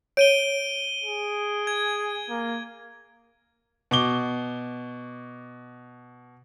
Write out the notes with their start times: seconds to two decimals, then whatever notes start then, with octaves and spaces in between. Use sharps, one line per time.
0.17 C#5 D7 D#7 G7
1.04 G#4
1.67 G#6
2.30 A#3
3.91 B2 D6 G7